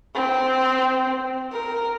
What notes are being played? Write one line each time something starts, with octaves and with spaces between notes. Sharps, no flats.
C4
A#4